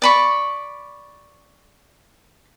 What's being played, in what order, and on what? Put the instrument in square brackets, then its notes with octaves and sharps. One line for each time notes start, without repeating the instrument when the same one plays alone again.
[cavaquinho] D5 B5 C#6